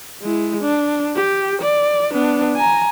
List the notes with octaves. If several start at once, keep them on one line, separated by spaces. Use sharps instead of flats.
G#3 E4
D4
G4
D5
B3 D4
G#5 A#5